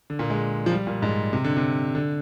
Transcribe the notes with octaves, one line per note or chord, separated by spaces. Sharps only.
D3
A#2
G#3
F3
G3
A#2
G#2
C3
D3
C3
D3